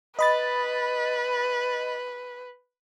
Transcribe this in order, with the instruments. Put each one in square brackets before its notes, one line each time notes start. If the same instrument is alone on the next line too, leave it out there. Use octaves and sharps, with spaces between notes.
[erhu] B4 [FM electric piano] D#5 B5 A6